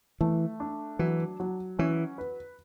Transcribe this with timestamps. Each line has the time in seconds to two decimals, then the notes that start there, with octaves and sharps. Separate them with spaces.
0.21 E3 A3
0.60 D4
0.99 E3 F#3
1.40 F#3
1.79 E3 C#4
2.18 B4